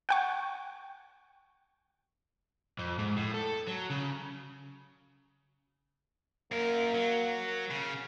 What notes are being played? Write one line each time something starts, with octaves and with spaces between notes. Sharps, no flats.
F#5 G5 C#6
F2
G#2
A2
A4
F#3
C#3
F#2 A#3 A#4
F#3
C#3